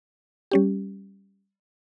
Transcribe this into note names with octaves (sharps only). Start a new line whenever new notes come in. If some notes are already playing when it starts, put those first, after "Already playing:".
G3 C#4 G4